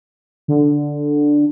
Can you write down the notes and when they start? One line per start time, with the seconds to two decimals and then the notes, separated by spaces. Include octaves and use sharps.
0.48 D3